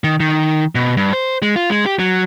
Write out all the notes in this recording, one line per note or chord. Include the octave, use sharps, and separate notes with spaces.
D#3
D#3
B2
G2
C5
G#3
F4
G#3
G4
F#3